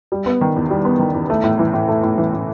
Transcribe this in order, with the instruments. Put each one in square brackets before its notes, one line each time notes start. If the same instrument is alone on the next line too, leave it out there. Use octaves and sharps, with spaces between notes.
[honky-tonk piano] G3
B3
D#3
E2
G3
B3
D#3
E2
A3
A2
E3
A2
A3
A2
E3
A2